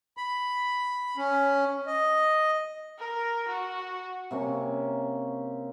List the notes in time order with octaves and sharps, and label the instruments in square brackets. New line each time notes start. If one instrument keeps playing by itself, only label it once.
[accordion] B5
C#4
D#5
[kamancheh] A#4
F#4
[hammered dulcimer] C3 A#3 C#4